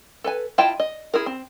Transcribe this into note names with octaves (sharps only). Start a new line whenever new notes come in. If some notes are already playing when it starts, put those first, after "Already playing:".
A4 B4 G#5
E4 F4 D#5 G5 A5
D#5
E4 G#4 A#4
C4